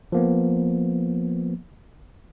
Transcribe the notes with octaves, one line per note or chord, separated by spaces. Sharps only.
F3 A#3 B3